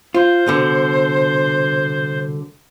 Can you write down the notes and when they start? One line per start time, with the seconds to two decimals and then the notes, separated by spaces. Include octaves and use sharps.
0.15 F4 C5
0.46 C2 B2 D3